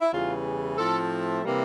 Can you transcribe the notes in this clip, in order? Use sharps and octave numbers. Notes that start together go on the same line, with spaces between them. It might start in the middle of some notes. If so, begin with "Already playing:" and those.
E4
E2 C#3 E3 G3 F4
A2 F3 A3 C4 A4
C3 E3 G3 A#3